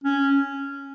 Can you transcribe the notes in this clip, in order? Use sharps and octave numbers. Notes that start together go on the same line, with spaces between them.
C#4